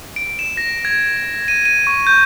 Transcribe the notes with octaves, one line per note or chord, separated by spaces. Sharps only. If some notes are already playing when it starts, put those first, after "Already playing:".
D7
E7
A#6
G#6
D#7
D#7
C#6
G6